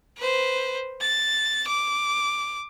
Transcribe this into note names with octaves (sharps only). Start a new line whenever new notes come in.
B4 C5
A6
D6